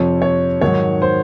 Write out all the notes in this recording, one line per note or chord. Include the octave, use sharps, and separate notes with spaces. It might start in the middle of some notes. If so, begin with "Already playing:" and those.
Already playing: F2 C3 F3 C#5
C#5
G#2 D#3 F#3 C#5
C5